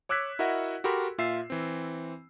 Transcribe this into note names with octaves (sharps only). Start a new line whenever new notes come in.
C#5 D6 E6 F#6 G#6 B6
E4 F#4 A#4 D#5 E5 F#5
F#4 G4 A4 A#4 B5 C6
A#2 F4 E5 E6 C7
E3 C4